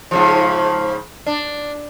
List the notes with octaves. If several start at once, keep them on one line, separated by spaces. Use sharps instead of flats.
G#2 C#3 F3
D4